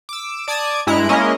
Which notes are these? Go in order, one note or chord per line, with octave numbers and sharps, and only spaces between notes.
D6 E6
D5 A5 D#6 G#6 D7
G2 G#3 E4 A#5 F#6 D7
G#3 A#3 C#4 E4 A#4 D#5